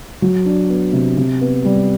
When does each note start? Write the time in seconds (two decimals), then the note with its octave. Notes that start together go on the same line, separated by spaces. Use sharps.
0.22 F#3
0.46 D4
0.69 B3
0.93 C3
1.17 C3
1.41 B3
1.64 G3